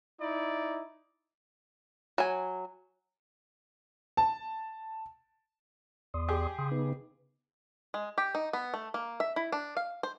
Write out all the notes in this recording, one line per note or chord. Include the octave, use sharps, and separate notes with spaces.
D#4 E4 D5
F#3 G#5
A5
E2 D5 C6 D#6
G4 G#4
C#3 G5 C6 D#6
B3 D#4 B4
G#3
G4
D#4
B3
A3
A#3
E5
E4
D4
F5
C5